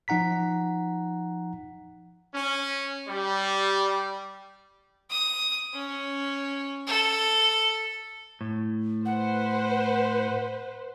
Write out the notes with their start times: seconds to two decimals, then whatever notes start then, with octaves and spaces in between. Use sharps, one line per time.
0.08 F3 D#4 F#5 A#5 B6
2.34 C#4
3.08 G3
5.10 D#6
5.74 C#4
6.87 A4
8.41 A2
9.06 B4 C5 F#5